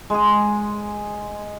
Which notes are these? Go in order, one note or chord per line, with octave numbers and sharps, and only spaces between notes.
G#3 G#4